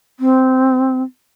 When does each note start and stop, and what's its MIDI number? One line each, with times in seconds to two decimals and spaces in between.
0.20 1.03 60